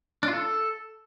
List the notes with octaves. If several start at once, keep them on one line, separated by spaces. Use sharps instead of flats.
D4
F4
A4